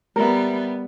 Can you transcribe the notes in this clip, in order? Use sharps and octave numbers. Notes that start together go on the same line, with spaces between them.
G3 B3 A#4 E5